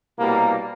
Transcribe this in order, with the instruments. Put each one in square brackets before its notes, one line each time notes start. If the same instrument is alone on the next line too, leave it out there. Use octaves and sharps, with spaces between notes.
[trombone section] C2 B2 G3 A#3